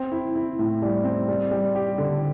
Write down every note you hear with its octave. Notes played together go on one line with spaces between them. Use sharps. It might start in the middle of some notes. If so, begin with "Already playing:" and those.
Already playing: C4
E4
E4
A2
G3
C4
G3
G3
G4
D3